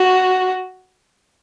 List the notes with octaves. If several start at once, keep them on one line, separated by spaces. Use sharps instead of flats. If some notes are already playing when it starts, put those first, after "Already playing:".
Already playing: F#4